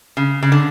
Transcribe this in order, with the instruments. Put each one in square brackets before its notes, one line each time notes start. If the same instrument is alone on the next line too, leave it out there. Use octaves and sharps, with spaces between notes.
[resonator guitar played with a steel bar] C#3
C#3
D3